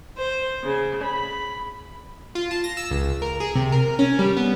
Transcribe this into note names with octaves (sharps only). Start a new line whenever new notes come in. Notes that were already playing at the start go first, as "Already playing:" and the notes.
C5
C#3
B5
F4
A5
A#6
E6
C#2
A#4
G#4
C3
A#4
C#4
G3
B3